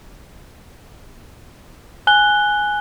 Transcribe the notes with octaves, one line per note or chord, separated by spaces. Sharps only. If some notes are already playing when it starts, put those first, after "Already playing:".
G#5 F#6 G7